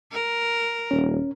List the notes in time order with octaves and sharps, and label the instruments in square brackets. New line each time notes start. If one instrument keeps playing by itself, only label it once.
[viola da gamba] A#4
[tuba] D#1 [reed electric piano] C#4